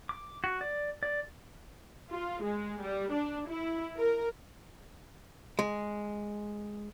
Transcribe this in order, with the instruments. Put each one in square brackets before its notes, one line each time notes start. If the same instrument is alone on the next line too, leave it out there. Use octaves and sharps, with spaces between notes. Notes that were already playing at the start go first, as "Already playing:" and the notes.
[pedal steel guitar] D6
F#4
D5
D5
[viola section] F4
G#3
G3
D4
E4
A#4
[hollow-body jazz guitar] G#3